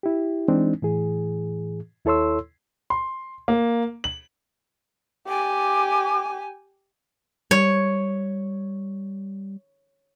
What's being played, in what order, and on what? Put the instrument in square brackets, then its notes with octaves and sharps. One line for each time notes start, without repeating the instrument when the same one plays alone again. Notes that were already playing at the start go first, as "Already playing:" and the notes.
[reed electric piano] E4 G4
E3 G#3 C4 D4 D#4
A2 E3 G#4
D#2 E4 A4 C#5 C6 E6
[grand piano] C6
A#3
F#7
[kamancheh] G4 G#5 [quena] D6
[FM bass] G3 [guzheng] C#5